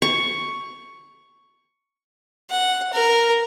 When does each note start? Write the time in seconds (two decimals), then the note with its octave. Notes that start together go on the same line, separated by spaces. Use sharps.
0.02 C#6
2.51 F#5
2.93 A#4